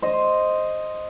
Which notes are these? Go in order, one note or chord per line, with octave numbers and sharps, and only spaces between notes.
C5 D#5